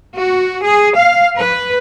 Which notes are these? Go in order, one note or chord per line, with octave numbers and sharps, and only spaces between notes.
F#4
G#4
F5
B4